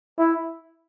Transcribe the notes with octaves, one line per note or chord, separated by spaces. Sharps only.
E4